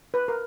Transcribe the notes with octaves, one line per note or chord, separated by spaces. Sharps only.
B4
A#4